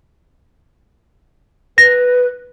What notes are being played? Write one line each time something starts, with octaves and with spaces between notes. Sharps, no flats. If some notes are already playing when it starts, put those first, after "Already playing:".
B4 A#6